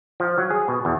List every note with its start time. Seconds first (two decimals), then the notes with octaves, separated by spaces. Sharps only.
0.20 F3
0.38 F#3
0.50 G#4
0.68 B2
0.85 E2